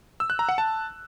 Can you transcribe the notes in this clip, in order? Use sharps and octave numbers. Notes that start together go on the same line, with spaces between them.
E6
F#6
A#5
F#5
A5